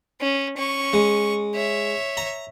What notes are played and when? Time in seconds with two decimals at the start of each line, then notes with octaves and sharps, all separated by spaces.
0.20 C#4
0.57 C#4 C#6
0.93 G#3
1.55 C#5 E5
2.17 A#5